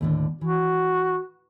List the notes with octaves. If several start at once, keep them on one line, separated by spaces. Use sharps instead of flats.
D#2 A2 D3
E3 F#4